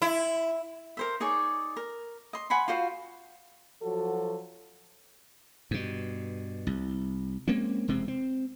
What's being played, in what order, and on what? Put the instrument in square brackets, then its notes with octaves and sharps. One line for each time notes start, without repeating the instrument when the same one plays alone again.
[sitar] E4
[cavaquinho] A#4 C5 E5
D#4 G#4 C#5 D5
A#4
D#5 C6
F#5 G#5 B5 C6
F4 F#4 C5 F5
[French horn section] F3 F#3 F#4 A4
[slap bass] G2 B2
C2
G#3 A#3 C4 C#4
E1 C3 G#3 C4
C4